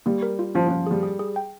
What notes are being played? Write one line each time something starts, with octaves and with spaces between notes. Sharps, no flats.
G3 A#3
A#4
F4
F3 C#4
F3 C#4
G3 G#4
G#4
G#4
G5